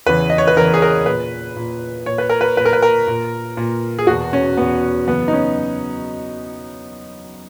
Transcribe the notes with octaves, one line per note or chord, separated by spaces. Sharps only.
E2 C#3 E3 B4
D#5
C#5
B4
E2 C#3 E3 A#4
G#4
A#4
A#2 B4
A#2
A#2 C#5
B4
A#4
B4
A#2 B4
A#4
B4
A#4
A#2
A#2
G#4
E2 B2 F#4
C#4
E2 B2 B3
F#2 C#3 E3 B3
D#4
C#4